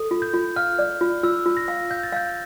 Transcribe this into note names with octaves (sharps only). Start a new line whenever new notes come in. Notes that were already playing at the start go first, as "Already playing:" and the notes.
Already playing: A4
F4
G6
F4
F5 F6
D5
F4
F4 E6
F4
A#6
F5
F5 G6
A6
F5 G6